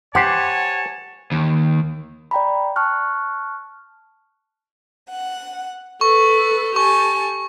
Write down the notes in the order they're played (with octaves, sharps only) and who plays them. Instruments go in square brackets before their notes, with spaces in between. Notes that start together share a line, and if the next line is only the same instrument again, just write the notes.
[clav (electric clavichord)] G4 C5 [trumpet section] C#5 G#5 A5 [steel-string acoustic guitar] F#5
[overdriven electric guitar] D#2
[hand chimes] D5 G5 A#5 B5
A5 C#6 F6 F#6
[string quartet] F#5
[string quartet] A4 B4 [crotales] C#6
[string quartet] G4 A4 G#5 [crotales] C#6